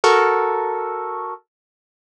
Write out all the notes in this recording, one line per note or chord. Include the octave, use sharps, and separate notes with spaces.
F#4 A4 A#4 C#6